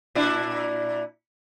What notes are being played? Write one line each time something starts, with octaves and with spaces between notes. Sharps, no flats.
A#2 D4 E4